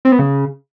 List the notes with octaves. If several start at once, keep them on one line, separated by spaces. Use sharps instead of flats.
C4
B3
C#3